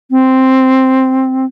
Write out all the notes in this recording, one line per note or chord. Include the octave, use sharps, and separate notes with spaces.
C4